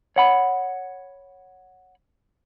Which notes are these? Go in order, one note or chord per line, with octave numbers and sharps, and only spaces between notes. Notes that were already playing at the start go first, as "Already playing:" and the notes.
C#5 F#5 B5